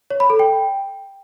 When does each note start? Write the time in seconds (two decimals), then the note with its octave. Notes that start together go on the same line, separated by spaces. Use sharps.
0.11 C#5
0.20 B5
0.30 A4
0.39 G5